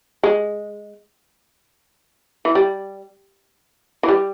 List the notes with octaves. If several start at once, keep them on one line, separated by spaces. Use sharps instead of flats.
G#3
E3
G3
E3
G3